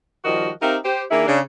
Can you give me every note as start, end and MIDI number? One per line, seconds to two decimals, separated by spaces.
0.25 0.51 51
0.25 0.51 53
0.25 0.51 55
0.25 0.51 66
0.25 0.51 70
0.25 0.51 75
0.62 0.77 60
0.62 0.77 63
0.62 0.77 67
0.62 0.77 70
0.62 0.77 76
0.62 0.77 77
0.85 1.04 67
0.85 1.04 72
1.11 1.25 51
1.11 1.25 58
1.11 1.25 62
1.11 1.25 64
1.11 1.25 68
1.11 1.25 76
1.27 1.40 49
1.27 1.40 62